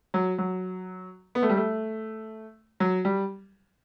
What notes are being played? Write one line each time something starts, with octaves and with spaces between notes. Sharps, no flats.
F#3
F#3
B3
A3
G3
A3
F#3
G3